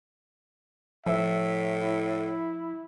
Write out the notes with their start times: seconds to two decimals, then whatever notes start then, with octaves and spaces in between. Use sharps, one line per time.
1.06 A2 F3 E5
1.81 E4